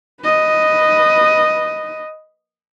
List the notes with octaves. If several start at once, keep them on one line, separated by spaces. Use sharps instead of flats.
B4 D#5